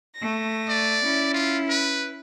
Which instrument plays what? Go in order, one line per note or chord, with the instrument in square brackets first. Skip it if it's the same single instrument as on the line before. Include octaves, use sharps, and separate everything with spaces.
[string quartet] A3 A#6
[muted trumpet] D5
[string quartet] C#4 E4
[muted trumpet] F4
B4